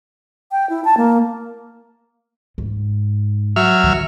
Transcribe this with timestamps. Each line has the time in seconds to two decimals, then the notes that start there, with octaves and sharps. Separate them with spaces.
0.52 G5
0.70 E4
0.85 A5
0.97 A#3
2.58 G#2
3.56 F#3 E5 F6
3.84 D3 D#3